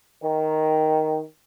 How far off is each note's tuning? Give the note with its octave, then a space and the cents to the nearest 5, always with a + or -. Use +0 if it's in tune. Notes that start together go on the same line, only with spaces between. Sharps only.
D#3 +5